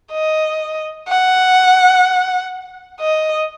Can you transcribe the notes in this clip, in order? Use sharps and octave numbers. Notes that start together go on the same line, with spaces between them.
D#5
F#5
D#5